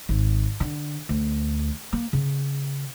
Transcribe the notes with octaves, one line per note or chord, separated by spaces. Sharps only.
G#1
D3
D2
A#3
C#3